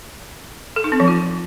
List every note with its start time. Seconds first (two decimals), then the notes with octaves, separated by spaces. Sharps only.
0.76 A4
0.84 D#4
0.92 C4
1.00 F3
1.08 F4